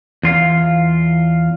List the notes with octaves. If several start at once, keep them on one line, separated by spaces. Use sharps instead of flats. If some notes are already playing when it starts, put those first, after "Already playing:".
E2 F4 F5